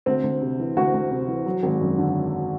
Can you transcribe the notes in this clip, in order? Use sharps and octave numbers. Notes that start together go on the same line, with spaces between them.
D2 C4
D2
C3
E3
D2 F#4
D2
C3
E3
F#3
G#1
F#2
D3